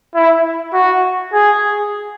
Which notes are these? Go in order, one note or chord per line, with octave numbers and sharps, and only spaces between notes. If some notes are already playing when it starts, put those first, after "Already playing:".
E4
F#4
G#4